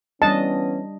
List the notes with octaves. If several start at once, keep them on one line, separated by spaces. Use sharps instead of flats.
E3 G3 B3 C#4 D4 D#5 A5